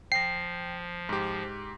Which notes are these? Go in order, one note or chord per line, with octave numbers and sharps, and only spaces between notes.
F3 G5 A#6 C7
G#2 G4